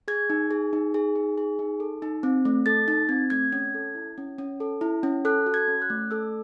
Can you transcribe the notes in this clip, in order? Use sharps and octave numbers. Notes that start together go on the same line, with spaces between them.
G#4 G#6
D#4
G#4
D#4
G#4
D#4
G#4
D#4
A4
D#4
C4
A3
A4 A6
D#4 A6
C4 G#6
A3 G#6
C#4 G#6
A4
E4
C#4
C#4
A4
E4
C#4
A4 F#6
F#4
G#6
C#4
F#6
A3
A4 E6